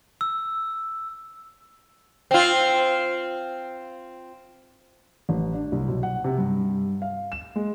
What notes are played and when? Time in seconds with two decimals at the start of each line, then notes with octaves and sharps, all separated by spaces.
0.21 E6
2.31 C4 F4
5.29 A1
5.53 D4
5.72 C2
5.88 B1
6.03 F#5
6.24 C3
6.38 G2
7.02 F5
7.32 E7
7.56 G#3